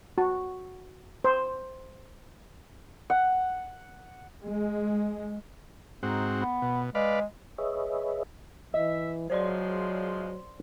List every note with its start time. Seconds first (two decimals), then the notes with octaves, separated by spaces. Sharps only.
0.18 F#4
1.24 C5
3.10 F#5
4.44 G#3
6.03 G#2 C4 D#4 F#4
6.41 B3
6.62 B2
6.95 G#3 B4 D5 F5
7.58 G#4 B4 C#5 D#5 E5
8.74 E3 D#5 E5
9.30 C#3 F3 F#3 G#3 C5 D5 C6